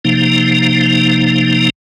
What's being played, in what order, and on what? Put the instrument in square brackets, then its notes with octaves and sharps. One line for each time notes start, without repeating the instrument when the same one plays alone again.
[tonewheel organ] C3 F3 A#3 D#4